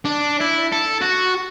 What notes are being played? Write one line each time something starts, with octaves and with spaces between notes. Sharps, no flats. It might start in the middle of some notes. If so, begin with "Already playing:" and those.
D4
E4
A4
F#4